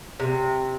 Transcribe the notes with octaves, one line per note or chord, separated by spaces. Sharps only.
C3